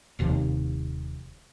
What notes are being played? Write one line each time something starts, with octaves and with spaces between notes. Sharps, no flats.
D#1 D#2 C3 F3